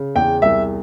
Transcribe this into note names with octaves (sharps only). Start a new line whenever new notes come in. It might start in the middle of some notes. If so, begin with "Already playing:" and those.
Already playing: C#3
E2 G5
C2 E5